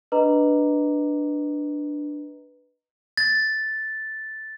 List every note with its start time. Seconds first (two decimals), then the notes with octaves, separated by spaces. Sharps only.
0.12 D4 B4 D#5 A#5
3.17 A6